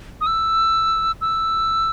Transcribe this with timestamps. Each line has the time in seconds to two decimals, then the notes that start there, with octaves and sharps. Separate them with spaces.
0.21 D#6
0.27 E6
1.21 E6